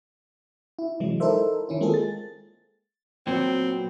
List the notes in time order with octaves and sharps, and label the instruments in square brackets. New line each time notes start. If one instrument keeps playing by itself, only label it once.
[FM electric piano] E4
C3 E3 F#3 G#3
D#4 E4 A4 A#4 C5 E5
D#3 C#4 E4
G#3 A#3 C4 F4 G#4 A4
A6
[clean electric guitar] A#2 F#3 B3 [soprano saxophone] C4